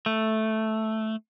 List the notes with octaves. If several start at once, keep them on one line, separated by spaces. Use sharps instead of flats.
A3